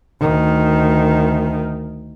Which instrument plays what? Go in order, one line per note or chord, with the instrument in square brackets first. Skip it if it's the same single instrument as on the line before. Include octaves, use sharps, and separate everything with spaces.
[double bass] D2 D#3